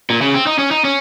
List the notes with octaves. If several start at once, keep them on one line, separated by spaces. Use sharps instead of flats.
A#2
C#3
C4
D#4
C#4
D#4
C#4